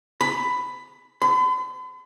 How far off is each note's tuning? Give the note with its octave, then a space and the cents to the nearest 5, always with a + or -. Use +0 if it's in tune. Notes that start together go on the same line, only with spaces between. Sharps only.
B5 +10
B5 +45